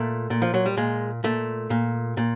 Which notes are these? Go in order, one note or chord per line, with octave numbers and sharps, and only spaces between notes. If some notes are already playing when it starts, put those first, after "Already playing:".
Already playing: A#2 A3
A#2
F3
F#3
G3
A#2 G#3
A#2 A3
A#2
A#2